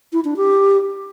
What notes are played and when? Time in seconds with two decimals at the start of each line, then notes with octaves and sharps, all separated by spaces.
0.13 E4
0.25 D4
0.37 G4